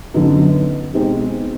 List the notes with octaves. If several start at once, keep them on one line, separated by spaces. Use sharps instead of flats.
F#2 D3 F#3 B3 D#4
B2 G#3 C4 D#4 G4